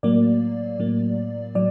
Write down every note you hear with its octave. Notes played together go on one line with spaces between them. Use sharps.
A2 F#3 A#3 D5
A2 F#3 A#3
A2 F#3 D5